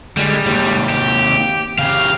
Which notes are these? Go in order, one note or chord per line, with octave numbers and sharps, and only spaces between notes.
D3 G3 G#3
D#2 C3
G4
C#3 G4 F5